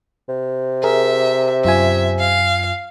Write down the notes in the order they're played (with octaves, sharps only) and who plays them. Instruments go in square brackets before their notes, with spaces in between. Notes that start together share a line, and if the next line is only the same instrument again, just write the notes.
[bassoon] C3
[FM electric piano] G#4 A#4 [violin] E5
[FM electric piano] F#2 F4 G#5 [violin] E5
[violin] F5